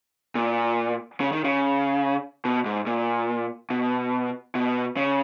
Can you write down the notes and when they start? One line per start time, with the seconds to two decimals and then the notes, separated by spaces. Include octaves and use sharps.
0.35 A#2
1.20 C#3
1.32 D#3
1.44 C#3
2.45 B2
2.66 G#2
2.87 A#2
3.70 B2
4.55 B2
4.97 C#3